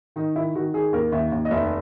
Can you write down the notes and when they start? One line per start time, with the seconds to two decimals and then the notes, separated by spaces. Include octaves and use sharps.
0.16 D#3 D#4
0.36 D#3 E4
0.55 D#3 F#4
0.73 D#3 G#4
0.93 D#2 A#4
1.12 D#2 E5
1.32 D#2
1.45 D#5
1.51 F1 E5